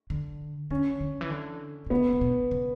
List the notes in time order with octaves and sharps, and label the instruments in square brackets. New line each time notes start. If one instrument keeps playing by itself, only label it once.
[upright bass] D3
[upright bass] D3 [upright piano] C#4
[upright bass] D3
E3
D3
B2
[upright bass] C#3 [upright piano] B3
[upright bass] C#3
B2
C#3